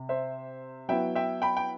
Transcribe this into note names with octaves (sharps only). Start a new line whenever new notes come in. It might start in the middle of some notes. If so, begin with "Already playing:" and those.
Already playing: C3
C5 E5
F#3 B3 E4 E5 G5
E5 G5
G5 B5
G5